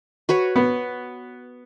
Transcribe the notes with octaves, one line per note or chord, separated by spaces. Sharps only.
F#4 B4 C#5
B3